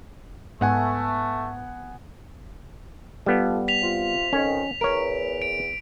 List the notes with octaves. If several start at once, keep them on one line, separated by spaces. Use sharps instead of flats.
G#2 A3 B3 F#5 G#5
G3 B3 F4 A4
B6 F7
C3 F4
F2 D#3 C#4
E2 A#4 C#5 D7
D7